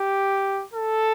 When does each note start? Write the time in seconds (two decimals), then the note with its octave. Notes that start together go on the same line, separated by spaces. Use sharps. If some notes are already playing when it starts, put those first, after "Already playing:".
Already playing: G4
0.73 A4